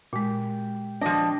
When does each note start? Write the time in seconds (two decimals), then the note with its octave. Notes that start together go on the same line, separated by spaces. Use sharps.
0.13 A#2 G#3 G4
1.01 F3 D4 G4 D#5